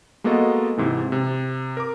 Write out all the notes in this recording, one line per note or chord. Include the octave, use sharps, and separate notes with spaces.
G#3 A#3 B3 F#4 A4 D#5
G#2 C3 E3
C3
A#4 D6